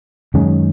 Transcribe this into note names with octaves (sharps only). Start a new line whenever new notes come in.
F#2 D#3 G#3 C#4